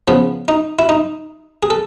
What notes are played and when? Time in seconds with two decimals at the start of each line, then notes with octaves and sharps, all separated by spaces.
0.08 C#3 F3 B3
0.48 D#4
0.79 E4
0.89 D#4
1.63 G#4
1.70 A4